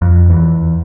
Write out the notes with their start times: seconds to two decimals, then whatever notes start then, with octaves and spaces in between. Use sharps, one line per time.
0.02 F2
0.30 E2